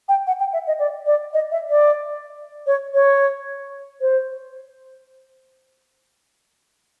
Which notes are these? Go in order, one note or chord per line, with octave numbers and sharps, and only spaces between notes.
G5
F#5
G5
E5
D#5
D5
D5
D#5
E5
D5
C#5
C#5
C5